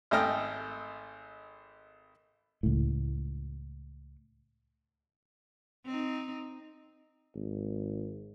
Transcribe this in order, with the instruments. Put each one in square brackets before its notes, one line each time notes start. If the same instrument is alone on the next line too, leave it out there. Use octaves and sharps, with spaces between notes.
[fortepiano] G#1 A3 A4 D#5 G5 F6
[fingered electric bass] C#2 A2
[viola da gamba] C4 D#4
[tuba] G#1